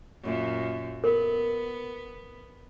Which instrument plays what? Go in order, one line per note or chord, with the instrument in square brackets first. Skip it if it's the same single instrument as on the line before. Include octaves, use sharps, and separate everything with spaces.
[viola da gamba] F#2 A#2
[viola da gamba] B3 [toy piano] A#4